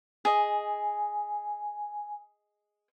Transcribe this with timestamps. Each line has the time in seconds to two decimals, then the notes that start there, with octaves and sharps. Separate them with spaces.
0.25 G#4 D#5 G#5